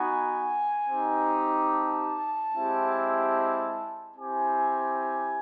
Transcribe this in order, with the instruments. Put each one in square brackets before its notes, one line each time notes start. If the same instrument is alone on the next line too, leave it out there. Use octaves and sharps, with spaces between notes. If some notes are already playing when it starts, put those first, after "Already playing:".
Already playing: [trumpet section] B3 D#4 F#4 G#5
C4 D#4 G4
A5
G#3 C4 E4 G4
C4 E4 G4 G#5